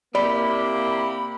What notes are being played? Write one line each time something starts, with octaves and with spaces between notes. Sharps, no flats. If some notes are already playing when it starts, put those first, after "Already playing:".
C3 A#3 E4 G4 D5 B5